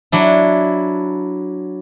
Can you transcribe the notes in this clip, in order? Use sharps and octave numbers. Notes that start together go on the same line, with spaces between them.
F#3 D4 E4